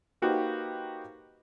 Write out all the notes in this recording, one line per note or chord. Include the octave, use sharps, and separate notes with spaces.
A#3 D#4 F#4 G4 B4 C5